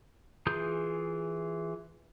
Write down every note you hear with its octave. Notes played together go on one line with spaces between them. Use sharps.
E3 F4 G#4 D#6 G6